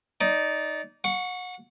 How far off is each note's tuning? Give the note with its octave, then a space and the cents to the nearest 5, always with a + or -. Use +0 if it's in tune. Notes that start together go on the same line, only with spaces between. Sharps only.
D#4 +0 D5 -20
F#5 -30 C#6 +10